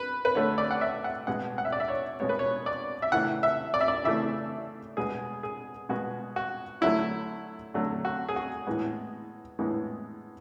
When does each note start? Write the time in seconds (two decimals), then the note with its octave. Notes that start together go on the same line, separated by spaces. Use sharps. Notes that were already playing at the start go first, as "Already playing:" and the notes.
Already playing: B4
0.25 B4
0.35 D3 A3 C#5
0.58 D5
0.71 F#5
0.81 E5
1.04 F#5
1.27 B2 G#3 B3 F#5
1.58 F#5
1.65 E5
1.72 D5
1.80 E5
1.88 C#5
2.20 B2 G#3 B3 C#5
2.29 B4
2.39 C#5
2.66 D5
3.02 E5
3.12 C#3 E3 A3 F#5
3.43 E5
3.74 D5
3.81 E5
3.88 D5
4.04 C#3 E3 A3 E5
4.97 B2 G#3 B3 G#4
5.43 G#4
5.89 B2 G#3 B3 F#4
6.36 F#4
6.81 D3 F#3 A3 E4
7.74 D3 F#3 A3
8.05 F#4
8.29 G#4
8.36 F#4
8.67 A2 E3 G#3 B3
9.59 A2 E3 G#3 B3